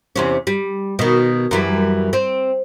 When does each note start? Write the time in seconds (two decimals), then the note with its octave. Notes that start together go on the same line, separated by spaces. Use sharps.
0.16 E2 C3 C#4
0.47 G3
0.99 B2 D#3
1.51 F#2 E3 G3
2.13 C4